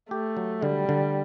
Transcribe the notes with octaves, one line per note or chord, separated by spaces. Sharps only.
A3 G4
F#3
D3 G3
D3